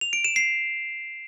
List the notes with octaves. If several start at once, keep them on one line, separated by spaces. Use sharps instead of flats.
F7
D7
E7
C7